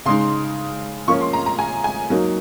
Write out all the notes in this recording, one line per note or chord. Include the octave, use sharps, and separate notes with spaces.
C#3 G#3 D#4 C6
F3 A#3 C#4 F4 C#6
C6
A#5
A#5
G#5
G#5
F#3 A#3 D#4